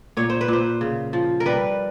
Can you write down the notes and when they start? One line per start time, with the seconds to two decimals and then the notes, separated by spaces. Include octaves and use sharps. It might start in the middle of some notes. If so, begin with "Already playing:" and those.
0.17 A#2 C#5
0.30 C5
0.41 B4
0.48 A#2 C5
0.81 C#3
1.13 F3
1.40 A#4
1.46 G3 B4